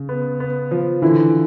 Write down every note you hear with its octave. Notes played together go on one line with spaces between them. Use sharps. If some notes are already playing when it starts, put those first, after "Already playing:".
Already playing: C#3
B3
B3
F3
D3 E3 E4